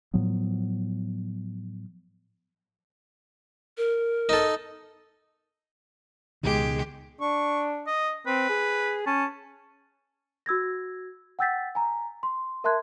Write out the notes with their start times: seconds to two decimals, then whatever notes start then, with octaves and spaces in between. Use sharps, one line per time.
0.14 A2 F3 F#3 B3
3.78 A#4
4.29 D#4 A4
6.43 C#2 B2 D#3 G#3 G4
7.21 D4 C#6
7.87 D#5
8.27 C4 B4
8.49 G#4
9.06 C#4 A5
10.46 F#4 E6 G#6 A#6
11.39 F#5 G5 E6 G6 A6 B6
11.75 G#5 A#5
12.23 C6
12.64 A#4 E5 A5 C6 F#6 G#6